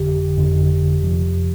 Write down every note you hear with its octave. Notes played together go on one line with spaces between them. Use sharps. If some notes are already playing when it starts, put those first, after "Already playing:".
Already playing: G1 F2 D3 G4
G1 F2 D3
F2 C3 F3